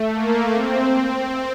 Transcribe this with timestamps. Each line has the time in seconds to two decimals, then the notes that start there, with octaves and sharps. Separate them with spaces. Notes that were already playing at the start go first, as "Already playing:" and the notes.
Already playing: A3
0.14 A#3
0.54 C4